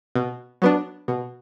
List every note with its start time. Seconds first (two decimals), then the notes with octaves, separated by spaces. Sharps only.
0.15 B2
0.62 F#3 B3 D4
1.08 B2